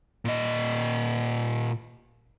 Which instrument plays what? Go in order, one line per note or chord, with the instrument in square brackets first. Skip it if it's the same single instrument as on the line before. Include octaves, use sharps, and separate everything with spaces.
[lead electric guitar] A#2 D#5